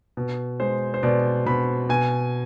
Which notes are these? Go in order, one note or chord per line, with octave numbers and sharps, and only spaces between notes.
B2
G#3 C5
C5
B2 D5
B2 B5
B2 G#5